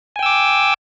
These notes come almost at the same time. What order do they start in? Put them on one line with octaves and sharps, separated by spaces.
G#5 G5 E6 D6